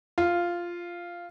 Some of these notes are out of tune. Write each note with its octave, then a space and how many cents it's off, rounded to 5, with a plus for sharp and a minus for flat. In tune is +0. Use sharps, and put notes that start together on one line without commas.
F4 -5